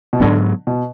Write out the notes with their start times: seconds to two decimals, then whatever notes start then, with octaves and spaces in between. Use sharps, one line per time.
0.13 B2
0.20 G#2 D3 F#3 B3
0.67 B2